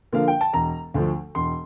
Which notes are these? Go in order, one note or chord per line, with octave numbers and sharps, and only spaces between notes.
D3 F3 A#3 F5
G5
A5
E1 A#5
D2 D3 F3 A3
E1 C6